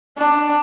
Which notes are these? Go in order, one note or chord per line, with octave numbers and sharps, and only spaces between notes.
D4